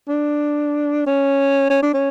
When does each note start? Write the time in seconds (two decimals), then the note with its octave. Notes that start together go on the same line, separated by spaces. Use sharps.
0.08 D4
1.06 C#4
1.70 C#4
1.83 D4
1.94 C#4